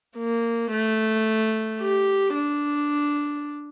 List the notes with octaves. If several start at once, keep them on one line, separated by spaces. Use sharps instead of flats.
A#3
A3
G4
D4